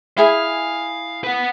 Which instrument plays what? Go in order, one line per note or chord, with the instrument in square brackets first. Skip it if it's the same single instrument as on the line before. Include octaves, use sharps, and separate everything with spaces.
[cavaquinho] E4 G#4 G#5 [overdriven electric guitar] F5
[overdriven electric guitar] B4 F#5